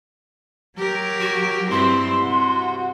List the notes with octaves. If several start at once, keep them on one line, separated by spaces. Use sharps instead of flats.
F#3 G4 A#4
F#4
G2 C4 E4 C6
C3 F#4